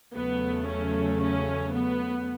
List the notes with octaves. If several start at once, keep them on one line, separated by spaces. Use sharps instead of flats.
E2 C#3 F#3 A3 B3
C#4
C#4
B3